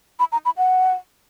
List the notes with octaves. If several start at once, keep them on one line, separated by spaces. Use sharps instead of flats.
B5
A#5
B5
F#5